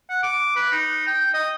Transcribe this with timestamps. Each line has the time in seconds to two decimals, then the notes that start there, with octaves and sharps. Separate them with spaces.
0.10 F#5
0.23 D6
0.56 B4
0.72 D#4
1.07 G5
1.34 D#5